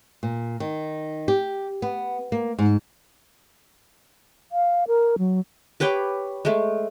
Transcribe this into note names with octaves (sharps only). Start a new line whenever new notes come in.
A#2
D#3
G4
B3
A#3
G#2
F5
A#4
F#3
G4 B4 C#5 G5
G#3 A3